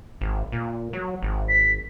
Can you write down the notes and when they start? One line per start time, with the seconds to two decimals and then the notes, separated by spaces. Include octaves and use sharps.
0.21 G#1
0.52 A#2
0.93 F#3
1.22 G#1
1.49 B6